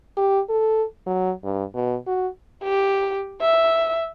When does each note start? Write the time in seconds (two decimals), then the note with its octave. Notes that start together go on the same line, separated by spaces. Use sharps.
0.17 G4
0.49 A4
1.06 F#3
1.44 G2
1.75 B2
2.07 F#4
2.64 G4
3.41 E5